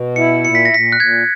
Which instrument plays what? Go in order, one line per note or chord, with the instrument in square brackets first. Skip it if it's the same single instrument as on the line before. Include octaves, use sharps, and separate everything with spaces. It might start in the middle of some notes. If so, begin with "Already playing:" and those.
Already playing: [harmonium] B2
[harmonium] E4 [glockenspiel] C#7
[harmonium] A#2 [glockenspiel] C#7
[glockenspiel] B6
A#6
[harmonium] A#2 [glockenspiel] B6
[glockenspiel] F#6
[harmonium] A#2 [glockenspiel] G#6